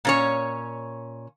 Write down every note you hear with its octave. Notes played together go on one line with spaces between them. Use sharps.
A#2 C#4 C#5